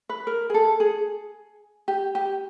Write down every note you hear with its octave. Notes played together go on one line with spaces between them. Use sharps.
B4
A#4
G#4
A4
G#4
G4
G4